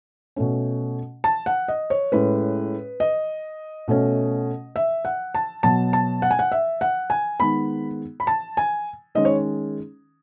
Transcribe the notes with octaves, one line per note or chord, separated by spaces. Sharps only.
B2 A3 C#4
A5
F#5
D#5
C#5
A2 G#3 C#4 B4
D#5
B2 A3 C#4
E5
F#5
A5
B2 F#3 B3 A5
A5
F#5
G#5
F#5
E5
F#5
G#5
D#3 G#3 B3 B5
B5
A5
G#5
D#3 G#3 C#4 D#5
C#5